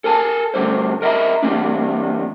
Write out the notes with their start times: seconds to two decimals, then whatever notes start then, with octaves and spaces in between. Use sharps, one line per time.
0.04 A4 A#4 G#5 A5
0.54 D2 C#3 G3 A4 C5
1.02 A#4 D#5 E5 A#5 B5
1.43 E3 G3 A#3 D4